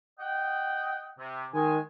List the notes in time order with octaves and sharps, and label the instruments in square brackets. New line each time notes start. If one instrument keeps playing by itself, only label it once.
[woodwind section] D#5 F#5 G5
C3
[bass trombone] D#3 [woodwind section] G#3 G#5